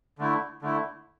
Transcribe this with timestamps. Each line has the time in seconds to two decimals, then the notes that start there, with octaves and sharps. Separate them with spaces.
0.19 D3 A3 E4
0.62 D3 A3 E4